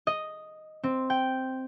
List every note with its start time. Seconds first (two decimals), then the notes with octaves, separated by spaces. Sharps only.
0.07 D#5
0.84 C4
1.10 G5